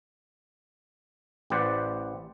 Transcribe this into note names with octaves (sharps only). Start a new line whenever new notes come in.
A1 G4 B4 C5 D5 F#5